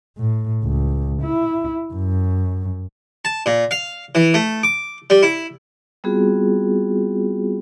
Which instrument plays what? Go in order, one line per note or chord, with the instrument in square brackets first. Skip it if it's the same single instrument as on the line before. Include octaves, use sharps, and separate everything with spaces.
[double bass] A2
C#2
E4
F#2
[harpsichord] A5
A#2
F5
E3
A3
D6
G3
E4
[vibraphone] G3 B3 C4 F4 F#4 G#4